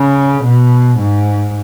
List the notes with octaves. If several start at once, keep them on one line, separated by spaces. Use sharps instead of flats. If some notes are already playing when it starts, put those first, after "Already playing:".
Already playing: C#3
B2
G#2